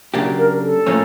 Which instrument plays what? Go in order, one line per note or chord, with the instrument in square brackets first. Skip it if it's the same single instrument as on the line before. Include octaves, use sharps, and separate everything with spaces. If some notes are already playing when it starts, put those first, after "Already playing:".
[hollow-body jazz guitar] C#3 F#3 A#3 D4 G4
[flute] A#4
A4
[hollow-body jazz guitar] A2 F3 A#3 C#4